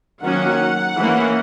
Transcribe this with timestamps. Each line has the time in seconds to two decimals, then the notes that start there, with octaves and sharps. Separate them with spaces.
0.23 D#3 F#3 A#3 C#4 F#5
0.99 E3 A#3 C#4